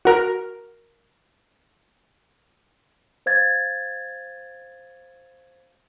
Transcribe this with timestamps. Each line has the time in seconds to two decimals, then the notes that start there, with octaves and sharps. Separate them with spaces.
0.05 F#4 A#4 F6
3.26 C5 F5 G#6 A6